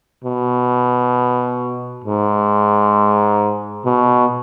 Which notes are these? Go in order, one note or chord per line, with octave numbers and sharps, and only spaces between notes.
B2
G#2
B2